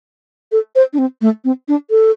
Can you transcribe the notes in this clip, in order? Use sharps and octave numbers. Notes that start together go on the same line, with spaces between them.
A4
C5
D4
C4
A3
C4
D4
A4